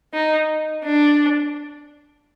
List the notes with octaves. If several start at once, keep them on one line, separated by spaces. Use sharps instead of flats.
D#4
D4